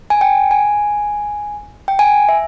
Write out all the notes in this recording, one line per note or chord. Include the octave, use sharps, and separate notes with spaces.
G#5
G5
G#5
G5
G#5
E5